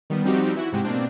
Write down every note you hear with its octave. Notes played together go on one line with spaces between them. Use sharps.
D#3 G3 B3
F3 G3 C4 D#4 F#4 G4
E3 E4 F#4
G#2 C3 G#3 F#4 G4
B2 A#3 C4 D4